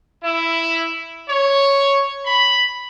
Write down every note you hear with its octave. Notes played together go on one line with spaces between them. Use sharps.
E4
C#5
B5